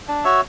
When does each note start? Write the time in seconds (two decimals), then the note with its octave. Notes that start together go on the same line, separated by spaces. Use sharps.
0.08 D4
0.24 F#4 C#5 E5